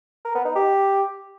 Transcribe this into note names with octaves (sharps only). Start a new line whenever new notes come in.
A#4
B3
D#4
G4